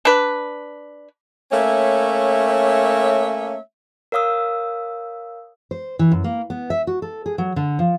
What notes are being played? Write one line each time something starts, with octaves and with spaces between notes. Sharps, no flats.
D4 B4
A3 A#3 C#4 C#5 E5
A#4 C#5 F5 D#6 E6
C5
E3
F#2
A#3
B3
E5
F#4
A4
G#4
F#3
D3
F3